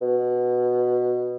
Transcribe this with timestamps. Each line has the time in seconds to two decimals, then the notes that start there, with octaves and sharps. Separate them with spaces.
0.02 B2